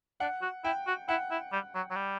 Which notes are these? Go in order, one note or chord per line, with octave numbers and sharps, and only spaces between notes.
D4 F#5
F#4
E4 G5
F#4
E4 F#5
E4
G3
F#3
F#3
G3